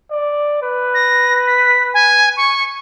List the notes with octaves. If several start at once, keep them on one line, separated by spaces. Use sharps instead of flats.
D5
B4
A#6
B6
G#5
C#6